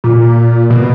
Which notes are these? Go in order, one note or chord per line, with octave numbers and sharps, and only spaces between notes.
A#2
B2